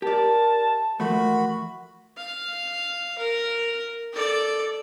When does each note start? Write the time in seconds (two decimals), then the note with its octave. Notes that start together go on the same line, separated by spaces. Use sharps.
0.02 G4 A#4 D5 A5
1.00 E3 F3 A3 F#4 A#4 B5
2.17 F5
3.17 A#4
4.12 A4 D5